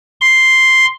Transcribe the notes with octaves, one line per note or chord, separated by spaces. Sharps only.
C6